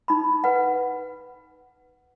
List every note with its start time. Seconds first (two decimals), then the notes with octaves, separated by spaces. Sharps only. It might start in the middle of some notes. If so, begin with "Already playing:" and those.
0.08 D#4 B5
0.44 B4 F#5